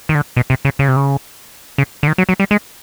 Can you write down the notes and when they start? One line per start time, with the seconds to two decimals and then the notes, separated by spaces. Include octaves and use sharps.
0.09 D#3
0.15 D3
0.37 B2
0.50 C3
0.65 C#3
0.79 C#3
0.88 C3
0.96 C#3
1.78 C#3
2.03 D3
2.08 D#3
2.18 F#3
2.29 F#3
2.40 G3
2.51 G#3